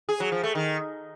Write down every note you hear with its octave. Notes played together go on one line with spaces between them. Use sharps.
G#4
F#3
F3
A3
D#3